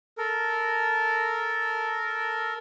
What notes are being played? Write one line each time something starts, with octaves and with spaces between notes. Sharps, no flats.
A4 A#4